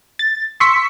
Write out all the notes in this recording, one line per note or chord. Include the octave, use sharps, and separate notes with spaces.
A6
C6 C#6 E6 B6 C#7